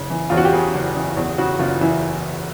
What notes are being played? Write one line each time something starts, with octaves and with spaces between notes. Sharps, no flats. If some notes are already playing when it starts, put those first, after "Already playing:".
Already playing: F#1 C#3
E3
E2 F4
F#4
G4
C#3 G#4
F#1
E3
E2
C#3 F#4
F#1 F4
E3 E4